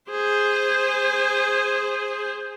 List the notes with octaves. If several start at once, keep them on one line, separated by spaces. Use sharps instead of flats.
G#4 C5